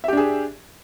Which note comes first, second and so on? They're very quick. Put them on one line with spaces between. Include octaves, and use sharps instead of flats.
E5 G4 D4 G#4